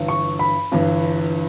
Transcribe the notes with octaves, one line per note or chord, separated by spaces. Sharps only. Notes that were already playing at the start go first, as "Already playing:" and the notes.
Already playing: G1 G2 E3
C#6
B5
G1 G2 E3